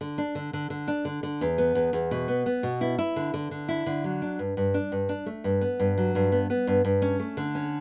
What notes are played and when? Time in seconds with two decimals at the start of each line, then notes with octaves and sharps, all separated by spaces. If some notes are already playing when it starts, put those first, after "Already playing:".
0.01 D3
0.18 D4
0.35 D3
0.53 D3
0.70 D3
0.88 D4
1.05 D3
1.23 D3
1.41 E2
1.58 B3
1.75 E2
1.93 E2
2.11 B2
2.28 B3
2.46 B3
2.63 B2
2.81 E4
2.98 E4
3.16 D3
3.34 D3
3.51 D3
3.68 E4
3.86 D3
4.04 F#3
4.22 D4
4.39 G2
4.57 G2
4.74 D4
4.92 G2
5.09 D4
5.26 A3
5.44 G2
5.61 B3
5.79 G2
5.98 F#3
6.15 G2
6.32 B3
6.50 B3
6.67 G2
6.85 G2
7.02 C#4
7.20 A3
7.37 D3
7.55 C#4